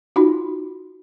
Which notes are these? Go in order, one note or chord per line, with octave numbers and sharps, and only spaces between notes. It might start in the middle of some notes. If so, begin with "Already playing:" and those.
D#4 F4 F#4